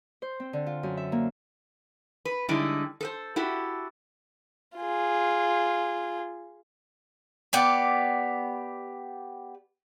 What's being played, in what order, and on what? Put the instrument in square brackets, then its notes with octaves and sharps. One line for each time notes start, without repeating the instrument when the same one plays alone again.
[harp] C5
C4
D3
F4
F#2
E5
A#3
[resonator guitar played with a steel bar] B4
D3 G3 G#3 D#4 E4
A4 B4 C5
E4 F#4 G4 A4
[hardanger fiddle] F4 G#4
[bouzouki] B3 G4 D5